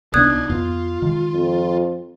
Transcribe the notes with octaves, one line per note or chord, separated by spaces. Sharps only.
C2 B3 D4 D#4 D5 D#6 F#6 G#6
F2 B3 F4
D#3 G#3
F2